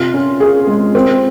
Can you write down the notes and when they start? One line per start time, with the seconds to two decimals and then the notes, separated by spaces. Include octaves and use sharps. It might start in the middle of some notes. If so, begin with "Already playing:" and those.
Already playing: C3 F4
0.14 C#4
0.40 G#4
0.67 G#3
0.95 C4